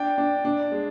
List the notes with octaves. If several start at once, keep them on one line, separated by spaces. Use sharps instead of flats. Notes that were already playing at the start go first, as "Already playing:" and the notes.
Already playing: D4 G5
D4
D4
G#3